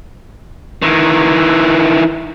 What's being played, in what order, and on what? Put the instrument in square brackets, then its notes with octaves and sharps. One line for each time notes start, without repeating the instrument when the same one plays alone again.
[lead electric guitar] D#3 E3